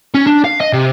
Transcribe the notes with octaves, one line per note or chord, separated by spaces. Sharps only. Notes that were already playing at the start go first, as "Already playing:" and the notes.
C#4
D4
F5
D#5
C3